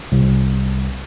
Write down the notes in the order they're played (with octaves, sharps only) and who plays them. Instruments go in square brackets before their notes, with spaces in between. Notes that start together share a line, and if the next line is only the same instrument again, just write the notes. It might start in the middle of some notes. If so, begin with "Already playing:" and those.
[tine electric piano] C2